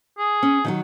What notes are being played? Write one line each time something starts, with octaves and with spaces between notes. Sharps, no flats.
G#4
C#4
D#3 F3 F#3